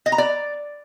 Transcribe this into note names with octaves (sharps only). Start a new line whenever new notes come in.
D#5
A#5
D5